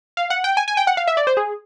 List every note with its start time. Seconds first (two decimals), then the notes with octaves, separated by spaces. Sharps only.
0.17 F5
0.30 F#5
0.44 G5
0.57 G#5
0.68 G#5
0.77 G5
0.87 F#5
0.97 F5
1.07 E5
1.17 D5
1.27 C5
1.37 G#4